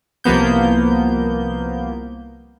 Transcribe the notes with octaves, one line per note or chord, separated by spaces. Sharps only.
C2 F3 A#3 B3 G6